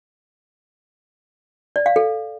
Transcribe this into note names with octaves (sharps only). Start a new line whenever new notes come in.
D5
F5
A4